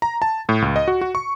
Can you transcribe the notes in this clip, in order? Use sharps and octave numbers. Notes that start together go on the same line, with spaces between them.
A#5
A5
A2
C#2
D#5
F#4
F#4
C#6